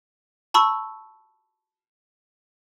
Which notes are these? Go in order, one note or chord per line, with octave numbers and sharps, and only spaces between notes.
A5 B5 C#6 E6